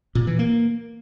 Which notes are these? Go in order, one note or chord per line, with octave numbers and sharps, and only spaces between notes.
A#2
E3
A#3